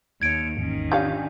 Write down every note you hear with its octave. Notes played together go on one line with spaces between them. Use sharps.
D#2 C#5 G#6 D7
G#1 E2 D#3 C#4
D4 F4 G4 C#5 F5 G#5 G6